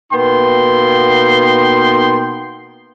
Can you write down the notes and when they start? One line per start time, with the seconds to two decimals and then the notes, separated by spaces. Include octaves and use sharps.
0.12 B2 A#3 B3 D#4 G5 C6